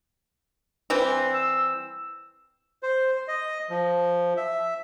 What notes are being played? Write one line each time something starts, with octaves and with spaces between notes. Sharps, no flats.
E3 G3 C4
E6
C5
D#5
F3
E5